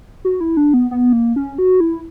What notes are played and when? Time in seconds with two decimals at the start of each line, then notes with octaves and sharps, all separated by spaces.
0.25 F#4
0.41 E4
0.57 D4
0.74 B3
0.91 B3
1.13 A#3
1.36 C#4
1.58 F#4
1.80 E4